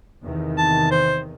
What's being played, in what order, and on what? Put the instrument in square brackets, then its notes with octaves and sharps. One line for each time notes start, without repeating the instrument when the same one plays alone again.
[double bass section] E2 C3 D#3
[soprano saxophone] A5
C5